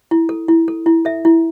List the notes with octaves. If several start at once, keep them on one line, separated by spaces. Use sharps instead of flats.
E4
A4
E4
A4
E4
A4 E5
E4